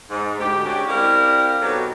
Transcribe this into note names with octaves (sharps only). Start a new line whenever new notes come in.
G#2
D2 G4
G#3 C#4 D4 F#4 G4
C4 E4 G4 A#4 D5 F5
B2 F#3 D#4 G4 A4